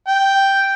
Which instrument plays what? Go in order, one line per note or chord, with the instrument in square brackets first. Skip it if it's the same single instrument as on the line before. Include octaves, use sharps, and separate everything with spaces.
[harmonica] G5